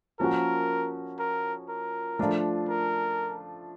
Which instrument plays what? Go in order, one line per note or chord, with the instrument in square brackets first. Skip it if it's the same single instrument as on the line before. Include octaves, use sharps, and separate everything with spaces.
[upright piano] F3 A#3 C#4 F#4 [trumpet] A#4
[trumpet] A#4
A#4
[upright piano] F3 A3 D4 F4
[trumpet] A#4